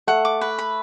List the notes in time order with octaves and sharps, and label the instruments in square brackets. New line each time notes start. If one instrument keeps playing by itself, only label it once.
[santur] A3 [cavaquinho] F#5
[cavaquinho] D6
B4
B5